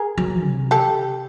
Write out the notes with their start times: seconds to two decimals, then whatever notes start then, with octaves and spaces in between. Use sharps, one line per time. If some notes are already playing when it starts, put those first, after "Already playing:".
Already playing: G#4 A#4
0.18 F#3
0.44 C3
0.71 G4 A4